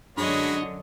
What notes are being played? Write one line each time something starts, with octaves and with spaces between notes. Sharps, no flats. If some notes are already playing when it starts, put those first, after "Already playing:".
F#2 D3 G#3 D4 F#4 C#5 D#5 B5